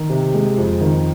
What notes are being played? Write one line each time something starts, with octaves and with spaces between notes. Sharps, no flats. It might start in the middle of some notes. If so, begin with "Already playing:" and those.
Already playing: D#3
C3
G#3
F2
D#3